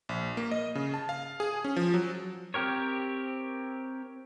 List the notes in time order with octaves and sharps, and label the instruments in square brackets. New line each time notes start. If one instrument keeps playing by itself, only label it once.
[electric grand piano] A#1
A#3
D#5
C#3
A5
F5
G#4
C#4
F3
F#3
[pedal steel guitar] C4 G4 A#4 C#5